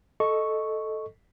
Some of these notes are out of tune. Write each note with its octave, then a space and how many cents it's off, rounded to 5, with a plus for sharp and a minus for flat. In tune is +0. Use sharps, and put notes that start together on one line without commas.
A4 -5 D#5 +0 C#6 +0